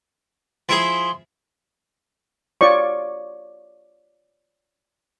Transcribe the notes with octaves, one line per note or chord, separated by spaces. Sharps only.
F3 E4 G#4 C6
F4 C#5 D5 C#6